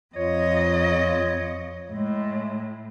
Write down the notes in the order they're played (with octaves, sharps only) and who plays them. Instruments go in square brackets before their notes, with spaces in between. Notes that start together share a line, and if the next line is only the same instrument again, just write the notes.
[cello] F2 D#5 [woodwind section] F4 C#5
[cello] A2 [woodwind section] G#3